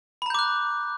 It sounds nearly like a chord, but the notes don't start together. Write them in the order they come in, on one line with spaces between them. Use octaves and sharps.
B5 A#5 G6 D6 F#6